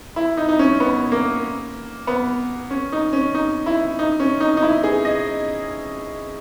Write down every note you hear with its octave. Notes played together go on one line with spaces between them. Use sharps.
E4
D#4
D#4
C#4
B3
A#3
B3
C#4
D#4
C#4
D#4
E4
D#4
C#4
D#4
D#4
E4
G#4
D#5